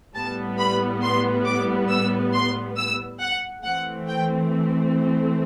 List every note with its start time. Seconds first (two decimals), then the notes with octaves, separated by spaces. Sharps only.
0.15 A2 G3 B3 A5
0.59 B5
1.03 C6
1.46 D6
1.89 E6
2.34 C6
2.77 E6
3.21 F#5
3.64 E3 A3 C4 F#5
4.08 G5